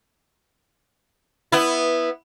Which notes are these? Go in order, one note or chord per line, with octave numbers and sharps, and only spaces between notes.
B3 E4